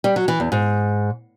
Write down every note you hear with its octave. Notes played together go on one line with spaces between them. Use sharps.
G3
F#3
E3
E2
G#2